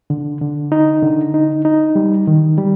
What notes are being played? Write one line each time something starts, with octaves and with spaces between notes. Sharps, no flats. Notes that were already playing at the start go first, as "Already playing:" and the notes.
D3
D3
D#4
D3
D#4
D#4
G3
D#3
G3